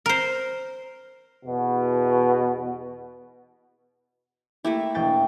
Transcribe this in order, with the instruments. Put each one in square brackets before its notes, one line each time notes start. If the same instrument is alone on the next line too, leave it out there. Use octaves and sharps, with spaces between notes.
[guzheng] A#4 C5
[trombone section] E2 B2
[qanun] A3 A#3 E4 [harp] G4
[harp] E1 G5 A6